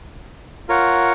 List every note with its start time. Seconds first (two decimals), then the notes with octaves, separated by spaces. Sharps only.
0.69 F4 A#4 C#5 F#5